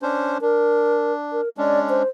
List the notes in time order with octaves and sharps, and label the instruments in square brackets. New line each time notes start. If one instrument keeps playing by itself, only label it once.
[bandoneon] C#4 D4 C5
[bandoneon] D4 [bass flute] A#4
[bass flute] A#4
[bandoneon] G#3 C#4 D4 [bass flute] D5
[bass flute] C5